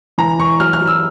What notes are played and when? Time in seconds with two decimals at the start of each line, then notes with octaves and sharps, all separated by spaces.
0.18 E3 A#5
0.39 E3 C#6
0.60 F#3 F6
0.73 F6
0.80 F#3
0.87 E6